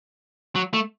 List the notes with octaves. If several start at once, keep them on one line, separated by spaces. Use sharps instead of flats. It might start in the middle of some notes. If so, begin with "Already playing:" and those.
F#3
A3